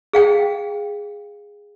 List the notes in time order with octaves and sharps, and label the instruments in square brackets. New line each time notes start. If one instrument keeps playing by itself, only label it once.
[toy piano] G#4 F5 G5